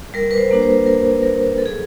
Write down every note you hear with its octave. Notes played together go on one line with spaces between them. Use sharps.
G3 A#4
B4
C5
A#3 D4 F#4
C5
G3 A#4
A#3 D4 F#4 A#4
F#3 A4
G#4